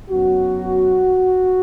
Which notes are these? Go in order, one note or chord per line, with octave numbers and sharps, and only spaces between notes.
F#2 F#3 B3 F#4